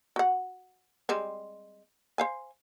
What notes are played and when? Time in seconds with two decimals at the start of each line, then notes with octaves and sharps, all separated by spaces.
0.16 F#4 F#5
1.09 G3 G#3 C4
2.18 C5 F5 G#5